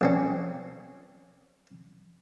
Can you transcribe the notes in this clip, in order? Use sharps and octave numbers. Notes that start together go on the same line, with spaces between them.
A#1 C4 C#4